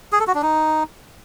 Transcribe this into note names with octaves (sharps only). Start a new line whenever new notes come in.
G#4
A4
F#4
D4
D#4